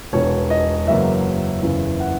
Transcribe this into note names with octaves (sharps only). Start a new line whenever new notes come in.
E1 E2 B2 C#5
D#5
F#1 E2 C#3 F#3 A#3 E5
F#1 E2 C#3 E3
F#5